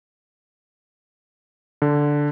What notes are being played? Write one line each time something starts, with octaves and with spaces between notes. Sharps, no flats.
D3